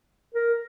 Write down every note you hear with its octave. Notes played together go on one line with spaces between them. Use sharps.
A#4